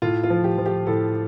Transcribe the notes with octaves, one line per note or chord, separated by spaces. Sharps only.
A2 F4
F4
F3
G4
F3
G4
A2 A4